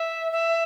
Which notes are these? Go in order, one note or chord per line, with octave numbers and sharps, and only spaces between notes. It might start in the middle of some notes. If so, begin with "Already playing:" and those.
Already playing: E5
E5